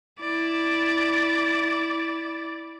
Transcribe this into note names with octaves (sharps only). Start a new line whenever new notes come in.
E4 D5